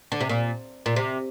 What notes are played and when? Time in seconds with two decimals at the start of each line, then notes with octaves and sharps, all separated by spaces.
0.12 D3
0.21 C3
0.29 A#2
0.86 A#2
0.96 C3